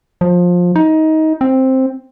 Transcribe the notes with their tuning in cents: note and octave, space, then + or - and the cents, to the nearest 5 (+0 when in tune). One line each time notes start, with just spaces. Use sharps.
F3 +20
D#4 +20
C4 +5